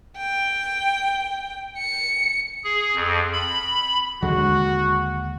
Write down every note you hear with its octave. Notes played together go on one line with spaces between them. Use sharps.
G5
C#7
G#4
F2
B5
D#2 D3 G#3 F#4